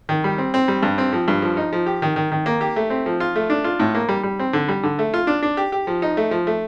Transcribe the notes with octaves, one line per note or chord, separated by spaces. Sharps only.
D#3
G3
C4
C4
G3
G2
C4
F3
G2
F3
D#4
F3
G4
D#3
D#3
D#3
A#3
G4
A3
C4
F3
F4
A3
D4
F4
A2
A#3
G3
G3
C4
D3
G3
D3
A3
F4
D4
D4
G4
G4
F3
D#4
A3
F3
A3